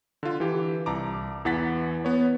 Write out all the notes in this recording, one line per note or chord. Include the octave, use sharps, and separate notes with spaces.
D3 F4
E3 G4
C2 A5 A#5 D6
E2 E3 F#5 A6 B6
B3 C#5